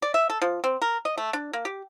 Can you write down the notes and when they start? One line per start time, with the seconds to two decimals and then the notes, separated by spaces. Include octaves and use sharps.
0.02 D5
0.14 E5
0.30 A4
0.42 F3
0.64 C4
0.82 A#4
1.05 D#5
1.17 A3
1.33 D4
1.53 A#3
1.65 G4